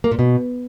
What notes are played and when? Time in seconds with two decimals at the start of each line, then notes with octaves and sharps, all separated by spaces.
0.04 A#3
0.11 A#2
0.19 B2